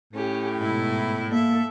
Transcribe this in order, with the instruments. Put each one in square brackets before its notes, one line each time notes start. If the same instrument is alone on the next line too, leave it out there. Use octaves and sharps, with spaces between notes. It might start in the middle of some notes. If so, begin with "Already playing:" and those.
[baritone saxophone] A2 [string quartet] C#4 G4
[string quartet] G#2 B2 E4
[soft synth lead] A#3 [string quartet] A4 E5